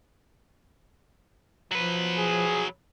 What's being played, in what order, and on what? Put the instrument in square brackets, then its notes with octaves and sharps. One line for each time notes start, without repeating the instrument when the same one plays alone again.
[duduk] F3 [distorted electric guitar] F#3 B4
[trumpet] G#4